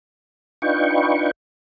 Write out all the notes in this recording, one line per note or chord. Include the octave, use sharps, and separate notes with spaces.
D4 D#4 F4 B4 G5 C#6